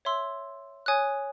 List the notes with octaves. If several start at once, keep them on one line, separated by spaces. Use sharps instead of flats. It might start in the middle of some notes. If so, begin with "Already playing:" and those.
C#5 E5 C6 E6
C#5 G#5 D#6 F#6